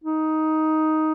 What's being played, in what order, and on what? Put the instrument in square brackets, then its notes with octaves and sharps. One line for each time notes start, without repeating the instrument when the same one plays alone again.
[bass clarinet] D#4